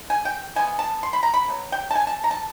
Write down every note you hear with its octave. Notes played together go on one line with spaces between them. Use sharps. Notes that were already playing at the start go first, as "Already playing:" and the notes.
Already playing: D3
G#5
G5
E3 G#3 B3 G#5
A5
C6
B5
A#5
B5
B2 F#3
G5
A5
G#5
A5
A#5
A5